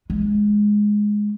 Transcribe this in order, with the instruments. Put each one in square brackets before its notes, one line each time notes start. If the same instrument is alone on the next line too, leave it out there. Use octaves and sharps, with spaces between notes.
[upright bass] G#3